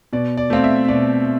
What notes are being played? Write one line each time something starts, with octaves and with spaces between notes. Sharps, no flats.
B2 D5
D5
A3 C4 F5
E5
B2 D5